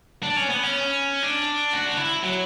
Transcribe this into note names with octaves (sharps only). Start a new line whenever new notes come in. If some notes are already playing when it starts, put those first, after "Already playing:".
D4
C#4
B3
C#4
D4
F#4
D4
E4
F#3